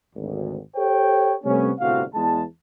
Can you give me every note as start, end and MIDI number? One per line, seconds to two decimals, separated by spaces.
0.15 0.58 32
0.15 0.58 38
0.76 1.34 67
0.76 1.34 69
0.76 1.34 72
0.76 1.34 73
0.76 1.34 79
1.44 1.71 48
1.44 1.71 55
1.44 1.71 57
1.44 1.71 59
1.44 1.71 61
1.79 2.02 31
1.79 2.02 36
1.79 2.02 45
1.79 2.02 48
1.79 2.02 66
1.79 2.02 77
2.14 2.42 40
2.14 2.42 56
2.14 2.42 81